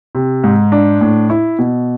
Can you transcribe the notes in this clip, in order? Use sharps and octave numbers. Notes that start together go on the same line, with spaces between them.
C3
G#2
D4
A2
E4
B2